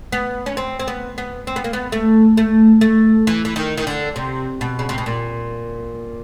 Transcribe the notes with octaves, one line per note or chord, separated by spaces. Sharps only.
B3
C#4
C4
C4
B3
B3
C4
B3
A#3
B3
A3
A3
A3
E3
E3
D#3
D#3
D3
C3
B2
C#3
C3
B2
A#2